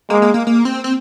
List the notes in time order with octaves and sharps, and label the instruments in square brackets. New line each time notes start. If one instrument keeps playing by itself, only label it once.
[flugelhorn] G#3 [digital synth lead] A#3
[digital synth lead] A#3
A#3
A#3
C4
C4